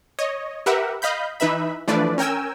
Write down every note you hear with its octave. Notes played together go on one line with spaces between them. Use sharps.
C#5 D#5
G4 A#4 B4 E5 F#5
D#5 F5 B5 G6
E3 D#4 B4 E5 B5
E3 F3 A3 D4 B4 D5
C#4 A#4 G5 G#5 E6